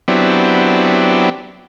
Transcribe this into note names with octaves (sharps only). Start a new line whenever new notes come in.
F#3 B3 C4 D4 E4 G4